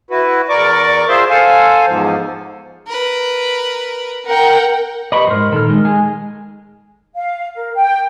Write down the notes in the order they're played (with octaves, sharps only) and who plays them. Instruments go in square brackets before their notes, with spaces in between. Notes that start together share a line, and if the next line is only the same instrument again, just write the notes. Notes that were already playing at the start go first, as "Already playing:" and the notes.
[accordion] E4 F#4 B4
E2 A#4 D5 C#6 D6
F4 G#4 C5 E5 C6
A4 C5 F5 G#5
E2 G#2 F3
[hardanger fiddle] A#4 B4
[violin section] A#4 F#5 G5
[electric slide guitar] G4 B4 D#5 [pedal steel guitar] D5 B5 C#6
[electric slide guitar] F2 G#2 [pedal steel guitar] A#4 C5
[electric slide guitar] A#2 A4 [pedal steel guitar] D#3 F6
[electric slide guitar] G#3
[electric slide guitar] G#3 [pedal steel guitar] G#5
[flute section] F5
A#4
G5